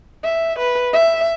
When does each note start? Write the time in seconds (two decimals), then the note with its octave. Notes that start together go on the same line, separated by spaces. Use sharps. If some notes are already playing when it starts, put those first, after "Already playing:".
0.25 E5
0.59 B4
0.93 E5